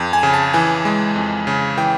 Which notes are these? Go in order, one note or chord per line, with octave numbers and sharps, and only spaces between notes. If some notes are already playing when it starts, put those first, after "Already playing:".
Already playing: F2
G#5
C#3
A5
E3 G#5
G#3
F2
C#3
E3 G5